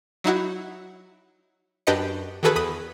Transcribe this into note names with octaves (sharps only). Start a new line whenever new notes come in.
F#3 D#4 E4 F#4
F#2 D4 G4 B4 D#5 C#7
D#3 E3 F#4 G#4 A4 B4
E2 B5 D#6